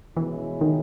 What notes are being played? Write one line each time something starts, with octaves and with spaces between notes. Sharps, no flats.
B2 E3 G#3 C#4 E4
D#3